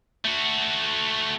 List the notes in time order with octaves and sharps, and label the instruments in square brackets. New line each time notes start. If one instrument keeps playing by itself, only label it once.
[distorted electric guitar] A3 F#4